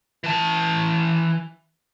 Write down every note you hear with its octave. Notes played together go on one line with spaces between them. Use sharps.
E3 A5